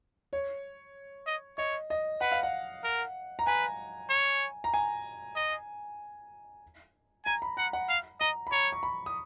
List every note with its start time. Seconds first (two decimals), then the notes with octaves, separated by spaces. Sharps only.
0.33 C#5
1.27 D#5
1.58 C#5 D#5
1.90 D#5
2.21 B4 F#5
2.32 F5
2.43 F#5
2.84 A#4
3.39 A#5
3.47 B4 G#5
4.10 C#5
4.64 A#5
4.74 G#5
5.36 D#5
7.25 G#5 A#5
7.42 B5
7.57 F#5 A#5
7.73 F#5
7.89 F5
8.20 D#5 A#5
8.47 B5
8.52 C#5 A#5
8.73 C#6
8.83 B5
9.06 D#6